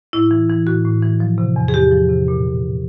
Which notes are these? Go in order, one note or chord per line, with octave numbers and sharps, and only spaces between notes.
A2 E4
E3
E3
A2 F#4
A2
E3
F3
C3
E2
G#4
E2 G4
F3
C3
A#2